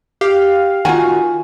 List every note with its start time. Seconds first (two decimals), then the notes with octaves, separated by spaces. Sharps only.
0.21 G4 F5
0.85 D#3 F4 F#4 G#5